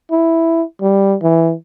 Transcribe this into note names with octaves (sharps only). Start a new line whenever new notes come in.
E4
G3
E3